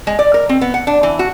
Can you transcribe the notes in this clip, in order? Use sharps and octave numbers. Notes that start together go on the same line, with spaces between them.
G#3
D5
A#4
C4
B3
F#5
D4
E3
F#4